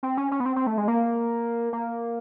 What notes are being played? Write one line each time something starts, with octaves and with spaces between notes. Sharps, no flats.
C4
C#4
C#4
B3
C4
C4
A3
G#3
A#3
A#3